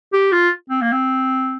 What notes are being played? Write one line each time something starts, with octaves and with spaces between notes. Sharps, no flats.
G4
F4
C4
A#3
C4